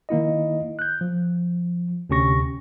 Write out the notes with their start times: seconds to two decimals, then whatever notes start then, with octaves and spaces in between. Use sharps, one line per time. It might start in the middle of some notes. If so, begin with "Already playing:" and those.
0.09 D#3 A#3 E4 D#5
0.79 F#6 G6
1.01 F3
2.10 D2 C3 C#4 G4 C#6 A#6